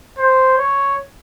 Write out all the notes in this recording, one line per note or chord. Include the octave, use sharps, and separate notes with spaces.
C5
C#5